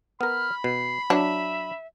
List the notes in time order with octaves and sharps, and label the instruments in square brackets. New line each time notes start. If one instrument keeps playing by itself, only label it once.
[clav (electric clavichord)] B3 A#4 [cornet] B5 [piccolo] F6
[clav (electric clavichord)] B2 [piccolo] C7
[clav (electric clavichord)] F#3 [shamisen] D4 [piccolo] E5